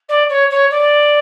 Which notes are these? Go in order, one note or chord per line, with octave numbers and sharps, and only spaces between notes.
D5
C#5
C#5
D5